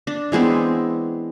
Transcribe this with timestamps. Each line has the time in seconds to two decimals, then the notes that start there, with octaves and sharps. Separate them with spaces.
0.07 D4
0.32 E3 G#3 B3 C4